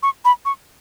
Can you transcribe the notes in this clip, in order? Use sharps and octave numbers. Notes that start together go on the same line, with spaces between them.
C#6
B5
C#6